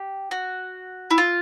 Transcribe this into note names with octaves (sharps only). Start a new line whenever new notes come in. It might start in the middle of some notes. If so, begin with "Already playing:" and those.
Already playing: G4
F#4
E4
F4